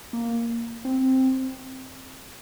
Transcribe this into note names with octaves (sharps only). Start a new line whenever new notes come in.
A#3
C4